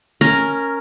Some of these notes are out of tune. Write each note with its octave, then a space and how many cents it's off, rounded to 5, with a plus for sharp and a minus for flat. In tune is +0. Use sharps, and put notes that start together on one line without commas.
C#4 +0 A#4 +0